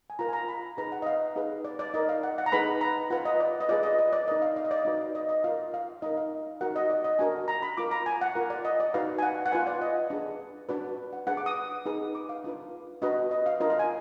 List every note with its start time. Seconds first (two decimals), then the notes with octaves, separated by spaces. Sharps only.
0.10 G#5
0.19 F4 A#4 A#5
0.29 G#5
0.33 A#5
0.48 B5
0.77 D#4 G#4 B4 A#5
0.92 F#5
1.02 D#5
1.06 F5
1.36 D#4 G#4 B4
1.65 D5
1.79 D5
1.94 D#4 A#4 D#5
2.09 F5
2.23 F#5
2.38 F#5
2.46 A#5
2.52 D#4 G#4 B4 B5
2.81 A#5
3.10 F4 B4 F#5
3.25 D#5
3.40 D5
3.60 D#5
3.69 F4 G#4 B4 D5
3.83 D#5
3.99 D#5
4.13 D5
4.27 D#4 A#4 D#5
4.42 F5
4.56 F5
4.64 D#5
4.71 D5
4.78 D#5
4.85 D#4 F#4 B4
5.15 D#5
5.29 D#5
5.44 F4 A#4 F5
5.74 F5
6.02 D#4 A#4 D#5
6.17 F5
6.61 D#4 F#4 A#4 F#5
6.76 D#5
6.90 D5
7.04 D#5
7.19 D4 F#4 A#4 G#5
7.48 A#5
7.62 B5
7.77 F4 A#4 D6
7.91 A#5
8.06 G#5
8.21 F#5
8.35 F4 A#4
8.50 D5
8.65 D#5
8.80 D5
8.94 D#4 F#4 B4 F5
9.19 G#5
9.23 F#5
9.46 F#5
9.52 F4 B4 G#5
9.67 D5
9.82 D#5
10.10 D4 G#4 B4
10.69 D4 F#4 B4 D5
11.13 F#5
11.27 D4 G#4 B4 F#5
11.37 D6
11.46 D#6
11.86 D#4 G#4 B4
12.15 D6
12.29 F5
12.44 D4 F4 B4
13.02 D4 F#4 B4 D#5
13.31 D#5
13.46 F5
13.60 D4 F4 A#4 D#5
13.70 F5
13.79 G#5